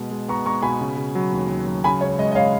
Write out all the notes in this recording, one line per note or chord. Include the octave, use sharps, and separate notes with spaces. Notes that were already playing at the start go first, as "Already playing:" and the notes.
Already playing: B2 G#3
G#3
B3 A#5 C#6
G#3 A#5 C#6
B2 G#5 B5
C#3
C#3
F#3
D#2
D#2
F#3
C#3 G#5 B5
C#2 C#5
G#3 D#5
D#5
G#3 C#5 F5